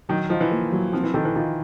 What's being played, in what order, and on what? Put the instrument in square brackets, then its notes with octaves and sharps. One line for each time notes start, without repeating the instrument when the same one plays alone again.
[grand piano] D#3 [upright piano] F#3
[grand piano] F3 [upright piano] D#4
[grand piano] E3
[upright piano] A#3
F#3
[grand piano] F3 [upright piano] C4
[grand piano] E3
[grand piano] D#3 [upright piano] A4
[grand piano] E3
[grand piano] D#3 [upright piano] F4